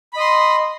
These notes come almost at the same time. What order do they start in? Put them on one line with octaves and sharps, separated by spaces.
B5 D#5 C6